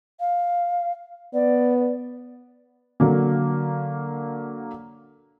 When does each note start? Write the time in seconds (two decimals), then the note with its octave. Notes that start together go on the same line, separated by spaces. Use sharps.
0.20 F5
1.34 B3 D5
3.00 D3 F#3 A#3